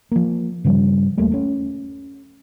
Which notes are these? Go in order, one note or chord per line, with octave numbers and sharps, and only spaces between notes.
F3 A#3
G2 C#3 F3 G3
D#1 G3 A3 A#3
A3 C#4